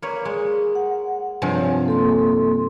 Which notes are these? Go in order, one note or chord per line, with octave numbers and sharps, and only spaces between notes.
A#3 B4 C#5
G#3
F#5
G2 C3 F3 C#5 G#5
A#3 A4 C6